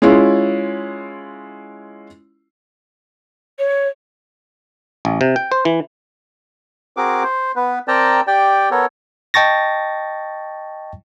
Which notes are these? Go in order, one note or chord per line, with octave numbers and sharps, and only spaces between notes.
G#3 C#4 E4 F4
C#5
A1
C3
G5
C5
E3
C4 F#4 G#4 A#4 D6
C5
B3 B4
C4 A#4 D5 G5 A5 A#5
G4 D5 G5
B3 A4 A#4 C#5
D#5 G5 A5 C#6 A6 A#6